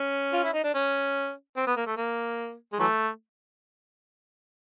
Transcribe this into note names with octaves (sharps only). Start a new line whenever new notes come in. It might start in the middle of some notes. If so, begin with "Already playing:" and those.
Already playing: C#4
F4
E4
D#4
D4
C#4
C4
B3
A#3
A3
A#3
G#3
E3 F#3 A3